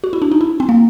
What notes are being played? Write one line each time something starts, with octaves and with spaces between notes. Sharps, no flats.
F#4
E4
D4
D#4
E4
C4
A#3